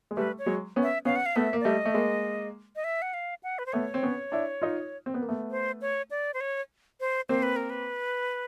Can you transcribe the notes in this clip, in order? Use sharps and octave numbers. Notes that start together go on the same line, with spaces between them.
G#3
G3 A3 B4
C#5
F#3 G#3
B3 C#4
E5
B3 C#4 F5
F#5
F5
A3 B3 E5
A#3
D5
G3 A3 D#5
A3
G#3 A#3
D#5
E5
F#5
F5
F#5
B4
C5
A3 B3 C#5
C4
B3 C#4
D4 E4
D#4 F4
C4
B3
A#3
A3 B3
C5
C#5
D5
C5
C#5
C5
A#3 C4 C5
B4
A#4
B4